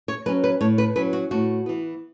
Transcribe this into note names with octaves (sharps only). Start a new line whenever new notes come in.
C#5
F#3 C#4 B4
B4
A2 C#5
B4
F#3 C#4 B4
F#4
A2 F#4
E3 B3